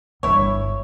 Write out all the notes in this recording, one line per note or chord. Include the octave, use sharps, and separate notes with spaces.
G1 G3 E4 C#5